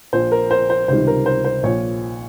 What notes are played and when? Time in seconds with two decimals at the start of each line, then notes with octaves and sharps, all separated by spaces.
0.13 A#1 A#2 F3 C5
0.32 A#4
0.51 C5
0.70 C5
0.88 C#2 C3 D#3 G3 C5
1.07 A#4
1.26 C5
1.45 C5
1.63 A#1 A#2 F3 C#5